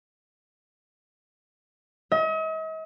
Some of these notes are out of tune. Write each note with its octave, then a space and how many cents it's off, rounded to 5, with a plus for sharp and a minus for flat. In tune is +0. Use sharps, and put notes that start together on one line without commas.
D#5 +45